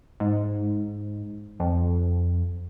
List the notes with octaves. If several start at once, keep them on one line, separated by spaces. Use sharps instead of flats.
G#2
F2